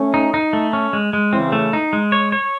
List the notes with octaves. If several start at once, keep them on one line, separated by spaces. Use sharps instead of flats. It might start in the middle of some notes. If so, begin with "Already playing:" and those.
Already playing: A3 C#4
D#4
D#4
A3
C#4
G#3
G#3
C#3 E3 C4
A3
D#4
G#3
C#5
C#5